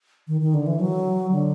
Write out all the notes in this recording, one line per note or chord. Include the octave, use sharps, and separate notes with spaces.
D#3
D#3
D3
E3
F#3
D3